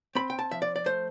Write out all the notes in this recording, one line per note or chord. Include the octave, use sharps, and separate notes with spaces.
C4 B5
G5
A5
F3 E5
D5
D5
A3 C5